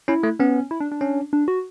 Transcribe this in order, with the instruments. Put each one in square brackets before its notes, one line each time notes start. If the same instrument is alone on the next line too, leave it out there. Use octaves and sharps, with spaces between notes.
[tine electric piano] C#4 [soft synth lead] E4
[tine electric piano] A3
[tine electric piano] B3 [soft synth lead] C#4
[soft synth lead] E4
D4
D4
[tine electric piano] C#4
[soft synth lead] D4
F#4